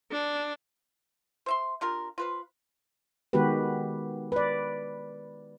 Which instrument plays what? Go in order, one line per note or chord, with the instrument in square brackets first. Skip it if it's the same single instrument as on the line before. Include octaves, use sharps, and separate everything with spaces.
[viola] D4
[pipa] C5 E5 C6
D4 F4 G4 A#4
F4 B4 C5
[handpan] D#3 G#3 B3 F#4 G4 B4
B4 D5